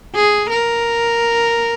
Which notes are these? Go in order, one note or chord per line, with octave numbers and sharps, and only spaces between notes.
G#4
A#4